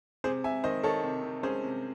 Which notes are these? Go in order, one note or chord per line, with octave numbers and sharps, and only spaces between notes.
C3 G#4 C5
C3 E5 G#5
D#3 C5 D#5
D#3 A4 C#5
C3
C3
C#4 G#4 C5
C3